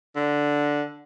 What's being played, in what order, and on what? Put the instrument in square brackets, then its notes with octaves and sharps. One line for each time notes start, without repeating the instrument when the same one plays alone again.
[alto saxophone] D3